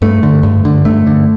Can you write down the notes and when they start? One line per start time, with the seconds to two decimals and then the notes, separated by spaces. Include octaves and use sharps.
0.02 G2 A3
0.23 D3
0.43 G2
0.65 D3
0.85 G2 A3
1.07 D3